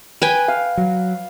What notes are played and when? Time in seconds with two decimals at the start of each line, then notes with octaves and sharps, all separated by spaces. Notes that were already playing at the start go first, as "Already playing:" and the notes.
0.22 B4 G5 G#5
0.48 F5
0.77 F#3